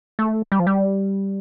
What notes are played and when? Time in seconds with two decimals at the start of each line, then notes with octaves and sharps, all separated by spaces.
0.19 A3
0.52 G3
0.59 F3
0.67 G3